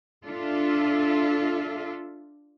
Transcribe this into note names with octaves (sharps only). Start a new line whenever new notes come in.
D4 F4 A4 E5